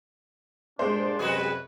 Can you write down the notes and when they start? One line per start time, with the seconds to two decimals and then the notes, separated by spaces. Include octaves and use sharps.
0.79 G2 A#2 G#3 D4 C5
1.19 F#2 C3 G3 F#4 G#4 B4